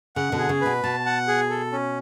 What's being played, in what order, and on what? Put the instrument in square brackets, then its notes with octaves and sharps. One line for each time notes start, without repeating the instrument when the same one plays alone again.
[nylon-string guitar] C#3 [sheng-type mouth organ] F#5
[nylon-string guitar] B2 D3
[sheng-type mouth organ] G#4
[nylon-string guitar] C#3
[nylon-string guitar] B2 [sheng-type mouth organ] B4
[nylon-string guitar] B2 [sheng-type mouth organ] A5
[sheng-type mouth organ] F#5
G#4
A4
C#4